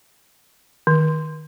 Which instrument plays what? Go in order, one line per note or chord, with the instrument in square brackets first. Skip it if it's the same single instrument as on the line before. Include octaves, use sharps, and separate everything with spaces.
[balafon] D#3